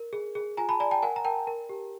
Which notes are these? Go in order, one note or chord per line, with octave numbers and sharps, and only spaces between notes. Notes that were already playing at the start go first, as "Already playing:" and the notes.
Already playing: A#4
G#4
G#4
F4 G#5 A#5
A5 B5
D5 G#5 A#5
G5 A5
A#4 F#5 G#5
A#5
A#4 G5 A5
A#4
G4